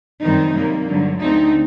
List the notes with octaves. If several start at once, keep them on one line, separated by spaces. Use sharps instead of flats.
F#2 D#3 G3 C4 D#4
C3 G3 A#3
G2 D3 F#3
D2 D3 A3 C4 D#4